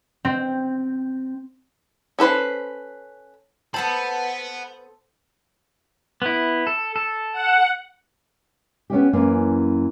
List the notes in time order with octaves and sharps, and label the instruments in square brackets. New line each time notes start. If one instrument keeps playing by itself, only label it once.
[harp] C4
[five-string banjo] C#4 A4 B4 C5
[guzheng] B3 A4 C5 [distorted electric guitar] F#5 B5 [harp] A5
[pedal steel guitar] B3 E4
A4
A4
[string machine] F#5
[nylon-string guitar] B3 C#4 D#4 G4
F#2 E3 A#3 C#4